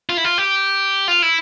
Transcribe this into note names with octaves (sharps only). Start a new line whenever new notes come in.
F4
E4
F4
G4
F4
E4